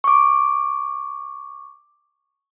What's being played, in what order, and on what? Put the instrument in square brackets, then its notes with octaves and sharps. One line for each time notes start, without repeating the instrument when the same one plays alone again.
[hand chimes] C#6 D6